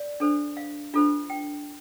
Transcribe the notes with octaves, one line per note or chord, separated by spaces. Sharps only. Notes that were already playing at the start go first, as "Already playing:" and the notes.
Already playing: D5
D4 A4 C5
F5
D4 F4 A4 C5
G5